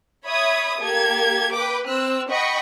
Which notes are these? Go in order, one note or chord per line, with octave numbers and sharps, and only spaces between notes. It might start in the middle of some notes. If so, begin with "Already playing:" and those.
C#5 E5 B5 D#6 G#6
A#3 G4 A4 G#6
B4 G5 D6
C4 E6 F#6
D#5 F#5 G5 B5 C#6